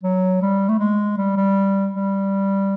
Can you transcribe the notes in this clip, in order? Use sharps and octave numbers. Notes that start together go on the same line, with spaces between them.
F#3
G3
A3
G#3
G3
G3
G3